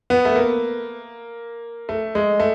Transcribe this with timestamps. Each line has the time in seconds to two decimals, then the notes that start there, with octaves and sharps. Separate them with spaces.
0.10 B3
0.25 A3
0.36 A#3
1.89 A3
2.15 G#3
2.40 A3